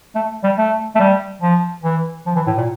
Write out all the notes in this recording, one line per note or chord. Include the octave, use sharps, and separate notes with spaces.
A3
G3
A3
A3
G3
F3
E3
F3
E3
A2
A#2